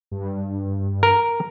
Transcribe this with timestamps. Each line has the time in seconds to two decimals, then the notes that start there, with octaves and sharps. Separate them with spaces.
0.12 G2
1.03 A#4